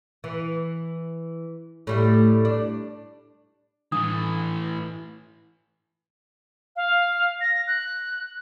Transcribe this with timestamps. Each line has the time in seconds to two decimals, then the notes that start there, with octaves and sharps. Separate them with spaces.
0.24 E3
1.87 A2 G3 A3
2.45 D4
3.92 A2 E3 D4 D#6
6.76 F5
7.41 A#6
7.67 F#6